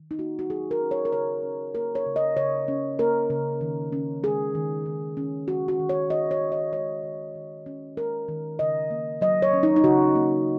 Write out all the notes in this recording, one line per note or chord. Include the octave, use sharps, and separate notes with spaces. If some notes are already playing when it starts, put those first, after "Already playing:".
Already playing: D#3
D#4
A#3 F#4
F#4
F#3 G#4
A#4
C#4
C#5
A#4
C#3 C#5
C#4
A#3 A#4
C#5
C#3
D#5
C#3 C#5
C#4
A#3 A#4
C#3
D#3
C#4
G#3 G#4
D#3
D#3
C#4
G#3 F#4
F#4
D#3
C#5
D#3 D#5
C#5
C#4
D#5
G#3 C#5
D#3
D#3
C#4
G#3 A#4
D#3
C#3 D#5
A#3
F#3 D#5
C#5
C#4
D#4
D#4
C#3 F#4
A#3